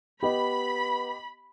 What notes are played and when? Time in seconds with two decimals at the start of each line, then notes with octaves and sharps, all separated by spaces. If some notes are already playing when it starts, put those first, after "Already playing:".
0.23 B3 G4 D#5 B5